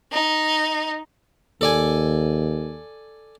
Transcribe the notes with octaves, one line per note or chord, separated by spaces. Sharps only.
D#4
D#2 A4 D5 G#5